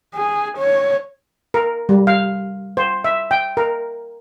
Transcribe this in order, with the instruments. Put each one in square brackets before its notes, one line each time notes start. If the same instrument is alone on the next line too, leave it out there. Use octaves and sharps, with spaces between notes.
[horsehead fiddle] G#4
C#5
[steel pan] A#4
G3
F5
C5
E5
G5
A#4